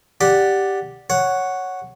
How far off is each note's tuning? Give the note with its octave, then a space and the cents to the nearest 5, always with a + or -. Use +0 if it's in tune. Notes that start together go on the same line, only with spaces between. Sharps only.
G4 +0 D5 +0 F#5 +0
C#5 +0 F#5 +0